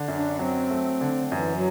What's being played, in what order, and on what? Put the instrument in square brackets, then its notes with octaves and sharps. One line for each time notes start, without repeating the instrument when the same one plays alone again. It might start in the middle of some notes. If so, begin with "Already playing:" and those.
Already playing: [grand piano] D3
F#2
[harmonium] D4
[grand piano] F#3 [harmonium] C4
[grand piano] A3
D3
[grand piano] F#2 [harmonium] E3
[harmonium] F#3